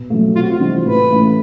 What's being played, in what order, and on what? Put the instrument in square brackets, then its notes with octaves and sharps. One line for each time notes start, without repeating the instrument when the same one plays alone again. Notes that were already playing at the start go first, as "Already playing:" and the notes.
Already playing: [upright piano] B2
F#3 A3
[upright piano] C3 [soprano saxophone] F4
[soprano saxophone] F#4
F4
[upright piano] E3 G3 C4 D#4
[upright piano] A2 [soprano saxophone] B4
[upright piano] E3 A3 C#4